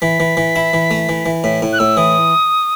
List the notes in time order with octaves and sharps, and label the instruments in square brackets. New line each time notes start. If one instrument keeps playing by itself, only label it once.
[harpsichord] E3 [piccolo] B6
[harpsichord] E3
E3
E4
E3
A3
E3
E3
[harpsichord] A2 [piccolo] B6
[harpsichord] A2
[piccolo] F#6
[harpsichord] A2 [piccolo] E6
[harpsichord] E3 [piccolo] D#6